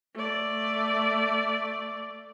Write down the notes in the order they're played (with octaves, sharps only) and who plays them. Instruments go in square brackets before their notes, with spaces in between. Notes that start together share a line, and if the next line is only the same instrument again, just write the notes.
[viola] A3 D5